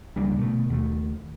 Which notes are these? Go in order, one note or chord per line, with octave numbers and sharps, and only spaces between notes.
C#2 G3 A#3 D4
B2 A3
D#2 A3